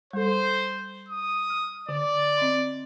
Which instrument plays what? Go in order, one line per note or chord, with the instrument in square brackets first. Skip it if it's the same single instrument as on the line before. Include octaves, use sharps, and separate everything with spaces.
[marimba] G3 A4 [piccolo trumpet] C5
[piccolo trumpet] D#6
[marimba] F6
[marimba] D3 [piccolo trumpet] D5
[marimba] C4 D#5 C6